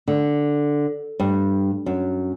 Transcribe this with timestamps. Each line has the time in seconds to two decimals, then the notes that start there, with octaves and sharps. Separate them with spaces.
0.08 D3
1.20 G2
1.86 F#2